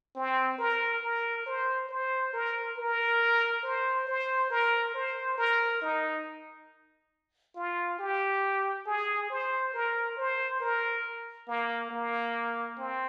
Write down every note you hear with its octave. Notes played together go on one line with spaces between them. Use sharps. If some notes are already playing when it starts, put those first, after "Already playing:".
C4
A#4
A#4
C5
C5
A#4
A#4
C5
C5
A#4
C5
A#4
D#4
F4
G4
G#4
C5
A#4
C5
A#4
A#3
A#3
C4